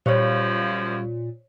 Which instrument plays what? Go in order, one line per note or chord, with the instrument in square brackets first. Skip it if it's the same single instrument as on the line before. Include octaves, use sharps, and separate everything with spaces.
[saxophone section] F#2 F3 [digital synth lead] A#2 [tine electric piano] G3 F5 C#6 [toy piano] C5 C#5